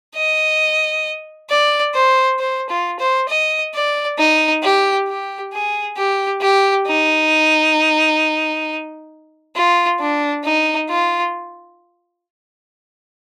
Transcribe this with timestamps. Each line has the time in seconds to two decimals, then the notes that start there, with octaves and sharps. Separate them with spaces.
0.16 D#5
1.50 D5
1.94 C5
2.39 C5
2.69 F4
2.99 C5
3.29 D#5
3.74 D5
4.18 D#4
4.63 G4
5.08 G4
5.53 G#4
5.97 G4
6.42 G4
6.87 D#4
9.55 F4
10.00 D4
10.45 D#4
10.90 F4